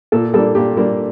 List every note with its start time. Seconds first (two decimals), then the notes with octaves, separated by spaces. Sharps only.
0.12 A#2 A4
0.34 G3 A#3 D4 A4
0.55 A#2 G4
0.77 G3 A#3 D4